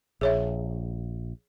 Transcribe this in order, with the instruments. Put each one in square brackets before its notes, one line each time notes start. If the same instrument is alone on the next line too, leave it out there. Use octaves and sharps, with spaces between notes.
[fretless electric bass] A#1 [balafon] G#4 C#5 E5